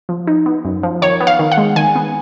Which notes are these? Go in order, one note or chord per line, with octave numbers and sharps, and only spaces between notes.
F3
D#4
B3
F#2
F3
D#3 C#5
B3
F5
D#3
F#5
G#3
D#3 G#5
B3